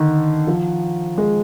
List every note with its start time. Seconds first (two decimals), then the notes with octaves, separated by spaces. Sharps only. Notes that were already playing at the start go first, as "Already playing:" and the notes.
Already playing: D3 D#3
0.47 F3
1.18 G#3